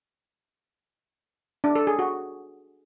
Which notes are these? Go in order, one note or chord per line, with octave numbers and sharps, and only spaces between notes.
D4
A4
G#4
F#4